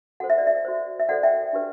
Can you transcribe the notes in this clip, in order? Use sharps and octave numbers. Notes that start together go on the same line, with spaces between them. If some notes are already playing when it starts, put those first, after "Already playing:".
F#4 A4 C5 F#5
E5
D5
E5
F#4 C5
E5
F#4 A4 C5 D5 F#5
E5 G5
D4 G4 B4